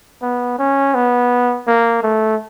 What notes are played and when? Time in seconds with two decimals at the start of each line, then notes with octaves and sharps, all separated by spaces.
0.22 B3
0.59 C#4
0.94 B3
1.67 A#3
2.03 A3